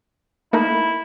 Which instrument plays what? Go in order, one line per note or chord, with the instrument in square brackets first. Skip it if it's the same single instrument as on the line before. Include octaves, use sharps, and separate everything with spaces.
[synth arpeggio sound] A3 A#3 D#4 [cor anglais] E4